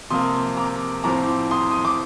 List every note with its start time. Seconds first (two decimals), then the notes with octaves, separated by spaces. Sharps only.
0.10 C3 F3 A#3 C6 D#6
0.57 A#5 D6
1.04 A2 F3 C4 A#5 D6
1.51 C6 D#6
1.71 D#6
1.85 D6